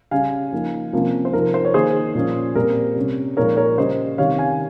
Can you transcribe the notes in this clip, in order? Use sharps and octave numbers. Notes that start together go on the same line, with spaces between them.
C#3 G3 C#4 F5 G#5
F3 A#3 D#4
C3 F3 A#3 C#4
C5
C3 F3 C4 D#4 A#4
C5
C#5
D#3 A#3 D#4 G#4 C5
A#2 F3 A#3 C#4
A#2 G3 C4 A#4
C3 G3 C#4
A#2 F3 G#3 D#4 A#4 C#5
A#4 C#5
C#3 G3 C#4 C5 D#5
C3 D#3 G3 C#4 C#5 F5
F5 G#5